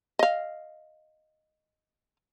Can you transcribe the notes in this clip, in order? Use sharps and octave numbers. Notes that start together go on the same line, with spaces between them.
D#5 F5